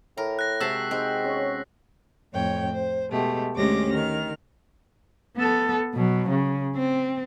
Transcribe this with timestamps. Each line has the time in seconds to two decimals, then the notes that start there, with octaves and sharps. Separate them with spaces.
0.18 A2 A#4
0.39 F#6 A#6
0.60 C3 G#3 F#4 A5 E6 B6 C7
0.91 G#3 C4 D#4
1.23 C#4 C#5
2.33 F2 A2 C#5 G5
2.72 C5
3.11 B2 G#3 A3 G4
3.55 D2 G#3 C#4 G4 D6 A#6
3.93 D#3 F6
5.37 B3 A4
5.94 B2 F#3
6.29 C#3
6.76 C4